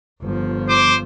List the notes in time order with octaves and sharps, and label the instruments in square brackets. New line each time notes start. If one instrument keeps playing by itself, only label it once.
[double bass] G1 F3
[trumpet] C5 [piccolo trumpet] D6